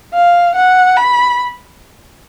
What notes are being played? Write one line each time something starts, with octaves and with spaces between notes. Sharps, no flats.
F5
F#5
B5